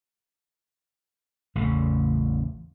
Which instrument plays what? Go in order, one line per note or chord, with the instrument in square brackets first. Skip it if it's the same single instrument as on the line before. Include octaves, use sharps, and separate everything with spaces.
[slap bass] A1 E2 C#3